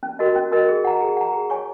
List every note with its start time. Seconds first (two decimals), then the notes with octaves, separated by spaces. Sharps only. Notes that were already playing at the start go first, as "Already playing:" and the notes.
0.03 C#4
0.19 F#4 A#4 D#5
0.35 C#4
0.52 F#4 A#4 D#5
0.68 G#4
0.84 F#5 A#5
1.01 G#4
1.17 F#5 A#5
1.33 G#4
1.50 C#5 G#5 C#6